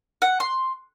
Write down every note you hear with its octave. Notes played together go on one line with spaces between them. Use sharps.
F#5
C6